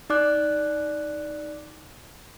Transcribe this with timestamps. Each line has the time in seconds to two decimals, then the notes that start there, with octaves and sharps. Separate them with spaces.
0.10 D#4 D5 D6 F#6